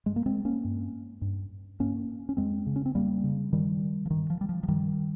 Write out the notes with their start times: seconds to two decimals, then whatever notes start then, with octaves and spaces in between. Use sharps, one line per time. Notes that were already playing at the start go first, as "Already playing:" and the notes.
0.06 G2 G#3
0.16 A#3
0.26 G#3 C4
0.45 A#3 C#4
0.64 G2
1.22 G2
1.80 G2 A#3 C#4
2.29 C#4
2.37 F2 G#3 C4
2.67 C#3
2.76 C#4
2.86 C4
2.95 F2 G3 A#3
3.24 C#3
3.53 G2 D#3 G3
4.06 F3
4.10 G2 D#3
4.30 F3
4.41 G3
4.49 F3
4.63 F3
4.68 G2 D#3 G3